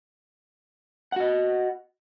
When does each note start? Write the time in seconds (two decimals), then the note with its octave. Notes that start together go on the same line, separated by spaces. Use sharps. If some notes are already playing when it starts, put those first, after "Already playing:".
1.12 F#5
1.16 F#4
1.20 D#5